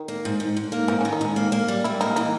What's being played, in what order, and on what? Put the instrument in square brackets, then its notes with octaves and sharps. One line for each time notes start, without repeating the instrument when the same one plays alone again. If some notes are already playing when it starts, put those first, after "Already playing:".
Already playing: [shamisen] D#3
[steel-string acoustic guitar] A#3
G#2
G#2
G#2
A#3
[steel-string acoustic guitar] G#2 [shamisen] E3
[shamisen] C#4
[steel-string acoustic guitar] D#3
[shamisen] D#4
[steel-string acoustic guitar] G#2 [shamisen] C#4
[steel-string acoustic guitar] A#3
A#3
G3
[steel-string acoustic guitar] G3 [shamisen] E4
[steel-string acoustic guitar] A#3 [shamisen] D#4
[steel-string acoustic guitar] E3 [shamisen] D#4